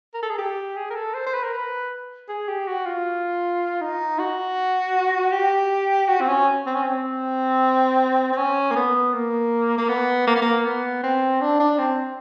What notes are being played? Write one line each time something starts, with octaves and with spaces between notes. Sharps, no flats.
A#4
A4
G#4
G4
G#4
A#4
A4
C5
C5
B4
A#4
B4
G#4
G4
F#4
F4
D#4
F#4
G4
F#4
C4
C#4
C4
C#4
C4
C4
C#4
A#3
B3
A#3
A#3
B3
A#3
B3
A#3
B3
C4
D4
D4
C4